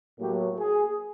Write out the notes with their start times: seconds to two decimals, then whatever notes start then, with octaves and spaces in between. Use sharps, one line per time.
0.19 A2 F#3 A#3 G4
0.59 G#4